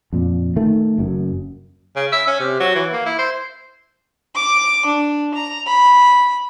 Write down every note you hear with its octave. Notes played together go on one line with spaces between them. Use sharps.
F2 A#2
D#3 A3
F#1 F#2
C#3
E5
C#4
C3
F#3
E3
A#3
E4
C5
D6
D4
A#5
B5